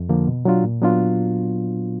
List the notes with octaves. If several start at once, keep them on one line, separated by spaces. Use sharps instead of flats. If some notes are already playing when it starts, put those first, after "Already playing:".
Already playing: F2
D3 F3 A#3
B2
F#3 D4 F4
A#2
F#3 B3 D4 F4